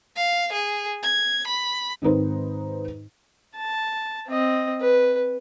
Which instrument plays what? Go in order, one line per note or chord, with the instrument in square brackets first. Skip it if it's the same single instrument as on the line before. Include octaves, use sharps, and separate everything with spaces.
[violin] F5
G#4
G#6
B5
[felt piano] G#2 D#3 C4 D#4 B4 C5
[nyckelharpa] A5
C4 D#5
B4